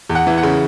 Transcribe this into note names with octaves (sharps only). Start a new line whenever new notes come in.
E2
F#5
E3
F#5
C#3